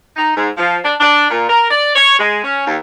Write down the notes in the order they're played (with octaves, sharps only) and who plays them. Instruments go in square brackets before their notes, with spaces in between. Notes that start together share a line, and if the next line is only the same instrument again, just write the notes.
[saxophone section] D#4
G#2
F3
D4
D4
A#2
A#4
D5
C#5
G#3
C#4
D#2